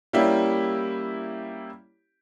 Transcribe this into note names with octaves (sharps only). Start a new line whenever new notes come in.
G3 A#3 C#4 E4 G4